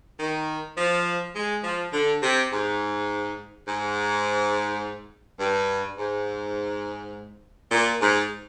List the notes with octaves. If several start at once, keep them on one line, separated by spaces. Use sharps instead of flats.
D#3
F3
G#3
F3
D3
C3
G#2
G#2
G2
G#2
A#2
G#2